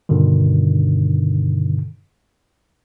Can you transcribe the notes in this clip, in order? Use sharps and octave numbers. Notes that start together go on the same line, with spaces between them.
G2 B2 D3 D#3